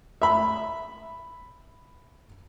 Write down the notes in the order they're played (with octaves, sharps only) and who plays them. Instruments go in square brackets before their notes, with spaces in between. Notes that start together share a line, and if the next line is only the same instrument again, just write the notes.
[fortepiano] E5 B5